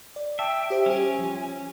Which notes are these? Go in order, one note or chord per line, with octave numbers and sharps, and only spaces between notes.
D5
E5 G5 A5 D6 D#6
G4 C5 E5
G3 C#4 G4 G#5
F3